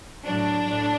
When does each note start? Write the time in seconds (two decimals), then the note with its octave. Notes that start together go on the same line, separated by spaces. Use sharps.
0.26 A2 F#3 D4
0.68 A2